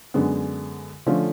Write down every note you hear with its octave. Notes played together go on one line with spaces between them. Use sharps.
F#2 D3 G#3 B3
D3 F3 A3 C#4 F4